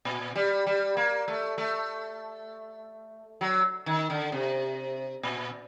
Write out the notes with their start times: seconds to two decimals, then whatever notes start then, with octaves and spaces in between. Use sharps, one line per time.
0.05 A#2
0.36 G3
0.67 G3
0.97 A#3
1.28 A3
1.58 A3
3.41 F#3
3.86 D#3
4.10 D3
4.32 C3
5.23 A#2